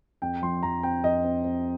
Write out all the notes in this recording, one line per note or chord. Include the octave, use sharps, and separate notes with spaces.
F2 G5
F3 C6
F2 A#5
C4 G5
F2 D#5
C4
C4